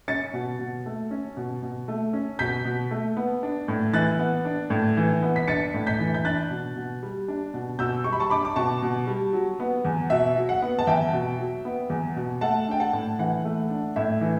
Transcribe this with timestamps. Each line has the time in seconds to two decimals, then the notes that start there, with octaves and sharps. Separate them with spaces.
0.08 C#4 A6 C#7
0.34 B2
0.59 B2
0.86 A3
1.11 C#4
1.37 B2
1.62 B2
1.88 A3
2.13 C#4
2.39 B2 G6 B6
2.65 B2
2.91 A3
3.17 B3
3.43 D4
3.68 A2
3.93 E3 F#6 A6
4.19 B3
4.45 D4
4.70 A2
4.97 E3
5.22 B3
5.36 B6
5.48 D4 A6 C#7
5.74 A2
5.87 G6 B6
6.00 E3
6.14 G6
6.25 D4 F#6 A6
6.50 B2
6.76 B2
7.03 G3
7.28 D4
7.54 B2
7.79 B2 E6 G6
8.04 G3 C#6
8.13 B5
8.20 A5 C#6
8.30 D4 B5 D6
8.45 D6
8.56 B2 A5 C#6
8.82 B2
9.07 G3
9.33 F#3
9.60 B3
9.85 E2
10.10 B2 E5
10.36 F#3
10.49 F#5
10.62 B3
10.79 A5
10.87 E2 E5 G5
11.13 B2
11.39 F#3
11.65 B3
11.90 E2
12.16 B2
12.41 A3 F#5 A5
12.68 D4 G5
12.80 F#5 A5
12.93 A2
13.19 E3 F#5
13.45 A3
13.70 D4
13.96 A2 E5
14.21 E3